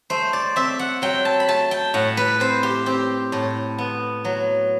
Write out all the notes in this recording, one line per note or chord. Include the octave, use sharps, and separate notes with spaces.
A3 C5
D5
C4 E5
F#5
F#3 G5
A5
B5
A3 A5
G5
A2 F#5
B4
C4 C5
G4
C4 G4
A2
B3
F#3